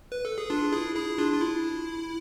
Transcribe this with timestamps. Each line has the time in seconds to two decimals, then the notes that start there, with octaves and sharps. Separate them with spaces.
0.12 B4
0.25 A4
0.38 G#4
0.50 D4 F4
0.72 E4 G#4
0.95 E4 G#4
1.18 D4 F4
1.33 F4
1.41 E4